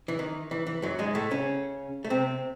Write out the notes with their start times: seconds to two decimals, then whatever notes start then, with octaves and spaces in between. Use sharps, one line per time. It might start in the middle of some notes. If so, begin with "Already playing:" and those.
0.08 E3
0.19 D#3
0.51 E3
0.67 E3
0.82 F#2 F#3
0.99 G#2 G#3
1.15 A2 A3
1.31 C#3 C#4
2.04 A3
2.10 C3 C4